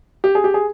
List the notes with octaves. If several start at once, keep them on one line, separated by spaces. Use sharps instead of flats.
G4
G#4
G4
G#4